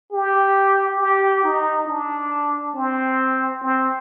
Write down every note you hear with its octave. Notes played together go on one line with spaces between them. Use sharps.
G4
G4
D#4
D4
C4
C4